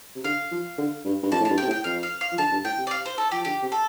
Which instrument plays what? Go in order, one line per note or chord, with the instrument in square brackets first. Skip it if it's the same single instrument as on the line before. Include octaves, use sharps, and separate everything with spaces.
[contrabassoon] C3
[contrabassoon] D3 [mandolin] F5
[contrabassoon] F3
D3
G2
G2
[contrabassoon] F2 [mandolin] A5
[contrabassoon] A2
[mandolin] A5
[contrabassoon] G2
[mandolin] G5
[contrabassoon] C3
A2
[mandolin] G5
[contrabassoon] F2 [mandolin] F5
[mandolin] F5
F5
[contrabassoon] F3
[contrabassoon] D3 [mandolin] A5
[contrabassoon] G2
[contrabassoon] A2 [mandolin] G5
[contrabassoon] C3
[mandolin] D5
F5
C5
A4
[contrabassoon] F3 [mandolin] G4
[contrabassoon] D3 [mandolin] G4
[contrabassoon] C3
[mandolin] A4